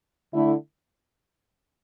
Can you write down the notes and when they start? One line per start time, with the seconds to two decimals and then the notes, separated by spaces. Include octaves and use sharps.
0.32 D3 A3 E4